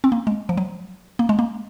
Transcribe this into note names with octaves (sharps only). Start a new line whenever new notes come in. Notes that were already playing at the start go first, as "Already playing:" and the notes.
C4
A#3
G#3
F3
F#3
A#3
G#3
A#3